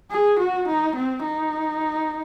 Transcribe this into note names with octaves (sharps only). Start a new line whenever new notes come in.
G#4
F#4
D#4
C4
D#4